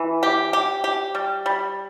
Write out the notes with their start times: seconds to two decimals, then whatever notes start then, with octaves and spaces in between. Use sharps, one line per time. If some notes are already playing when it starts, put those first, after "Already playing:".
Already playing: E3
0.23 G4
0.53 G4
0.84 G4
1.15 G3
1.46 G3